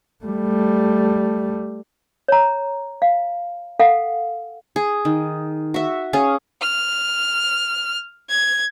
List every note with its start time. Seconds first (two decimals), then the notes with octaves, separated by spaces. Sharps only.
0.25 G3 A3
2.28 C#5 A#5
3.02 F5
3.79 A4 F5 F#5
4.76 G#4
5.05 D#3
5.74 F#4 E5
6.13 C#4 G#4 F5
6.61 F6
8.30 G#6